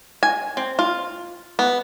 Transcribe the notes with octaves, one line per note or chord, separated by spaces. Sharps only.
G#5
C4
F4
B3